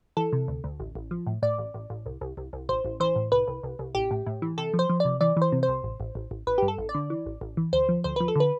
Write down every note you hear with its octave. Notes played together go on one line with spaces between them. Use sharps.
E3 A4
C3
D2
D2
A1
A1
F3
A2
A2 D5
A1
A1
A1
C2
C2
C2
C2
A1 C5
A1
E3 C5
A2
C2 B4
C2
C2
C2
A1 G4
A2
A2
E3
C3 A4
F3
C5
F3
C3 D5
E3 D5
E3
C5
C3
C5
C2
A1
A1
A1
A1
A1 B4
G2 G4
A4
A1
D5
D3
E3
A1
A1
E3
D2 C5
F3
D2 C5
F3 B4
A4
D3 B4